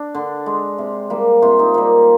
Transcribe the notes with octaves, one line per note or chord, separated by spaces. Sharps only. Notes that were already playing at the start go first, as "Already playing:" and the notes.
Already playing: D4
D3
G#3
C3
G3 A#3
C3 F4
D#4
G3 A#3